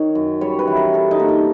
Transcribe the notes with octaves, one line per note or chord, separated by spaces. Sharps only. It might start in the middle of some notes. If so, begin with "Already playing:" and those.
Already playing: D#3 C#5
F#2
G3 C#5
B4
E3
A#4
G3 A4
D#4
A#2
D4